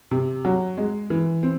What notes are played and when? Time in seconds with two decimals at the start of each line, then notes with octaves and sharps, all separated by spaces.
0.11 C3
0.45 F#3
0.77 G#3
1.10 E3
1.43 C4